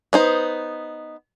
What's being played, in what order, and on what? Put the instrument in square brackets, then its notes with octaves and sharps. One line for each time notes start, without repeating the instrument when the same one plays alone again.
[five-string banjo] B3 D#4 C5